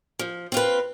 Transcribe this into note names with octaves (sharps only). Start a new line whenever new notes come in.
F3
C4 F4 B4